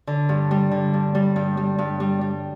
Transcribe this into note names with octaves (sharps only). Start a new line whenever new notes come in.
D3
G2
G3
D3
G2
G3
G2
G3
G2
G3
G3